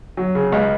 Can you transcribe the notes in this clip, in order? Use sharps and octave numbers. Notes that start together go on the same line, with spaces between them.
F#3
C#3
C#2